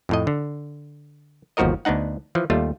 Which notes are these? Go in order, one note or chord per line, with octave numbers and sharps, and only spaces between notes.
F2 A2 D#5
D3
G1 D#2 F3 F#4 A#4 D#5
D2 B3 D4 D#4 F#5
E3 F3
D#2 G3 A3 F4